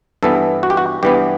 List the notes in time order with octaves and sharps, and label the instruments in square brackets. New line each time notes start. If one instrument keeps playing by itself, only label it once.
[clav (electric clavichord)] G2 E3 B3 A4
F#4
G4
F#4
G2 E3 B3 G4